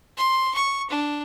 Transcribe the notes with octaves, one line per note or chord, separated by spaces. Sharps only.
C6
C#6
D4